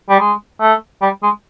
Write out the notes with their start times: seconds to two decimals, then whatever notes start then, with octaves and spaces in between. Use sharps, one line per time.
0.10 G3
0.20 G#3
0.61 A3
1.02 G3
1.23 G#3